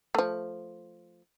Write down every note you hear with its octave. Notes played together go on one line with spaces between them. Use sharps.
F3 A3